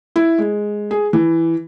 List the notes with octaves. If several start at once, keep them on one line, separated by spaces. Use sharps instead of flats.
E4
G#3
G#4
E3